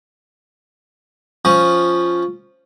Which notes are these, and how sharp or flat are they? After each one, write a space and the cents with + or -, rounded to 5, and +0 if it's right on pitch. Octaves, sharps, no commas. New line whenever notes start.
F3 +0 C#4 +0